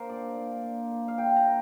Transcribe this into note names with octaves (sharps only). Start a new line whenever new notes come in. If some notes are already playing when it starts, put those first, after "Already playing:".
Already playing: A#3 D4 A#4 C5
A#2 D5
A#3 D4
A#2
A#3 D4
F5
A#2 G5
A#5
A#3